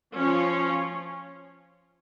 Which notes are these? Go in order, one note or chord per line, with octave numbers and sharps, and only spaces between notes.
F3 C#4 F4 C#5